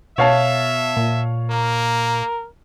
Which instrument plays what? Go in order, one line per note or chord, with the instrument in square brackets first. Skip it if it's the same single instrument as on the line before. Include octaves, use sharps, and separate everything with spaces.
[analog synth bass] B2 [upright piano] C#5 F5 A5 [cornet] E5
[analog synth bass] A#2
[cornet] A#3 [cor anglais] A#4